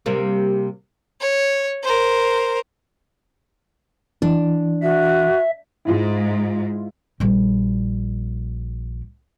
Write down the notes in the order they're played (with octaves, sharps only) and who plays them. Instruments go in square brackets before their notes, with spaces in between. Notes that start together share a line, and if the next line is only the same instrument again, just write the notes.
[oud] C3 G3 A#3
[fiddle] C#5
A#4 C5
[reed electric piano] E3 [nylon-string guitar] D4
[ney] F#4 [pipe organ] E5
[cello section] G#2 [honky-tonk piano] E4 F4
[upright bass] A#1 G3